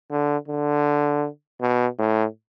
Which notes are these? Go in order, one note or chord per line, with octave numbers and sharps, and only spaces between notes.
D3
D3
B2
A2